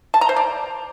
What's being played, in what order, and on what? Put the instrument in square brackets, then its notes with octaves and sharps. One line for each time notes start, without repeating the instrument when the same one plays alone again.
[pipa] A5
A#5
C5
D5